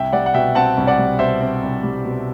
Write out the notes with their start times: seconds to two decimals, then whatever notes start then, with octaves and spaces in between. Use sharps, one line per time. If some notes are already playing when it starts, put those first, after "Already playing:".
Already playing: C2 E5 G5
0.13 G3 D5 F#5
0.26 F#5
0.34 B2 E5 G5
0.55 C4 F#5 A5
0.77 C2
0.87 D5 F#5
0.99 G3
1.19 B2 C5 E5
1.41 C4
1.63 C2
1.83 G3
2.05 B2